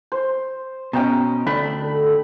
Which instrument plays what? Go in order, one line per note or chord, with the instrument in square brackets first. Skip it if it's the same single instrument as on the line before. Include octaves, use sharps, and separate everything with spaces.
[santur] C5
[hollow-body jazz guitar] B2 C#4 [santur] D#5 G5 A#5
[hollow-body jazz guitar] D2 A3 D4 [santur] B5
[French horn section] A4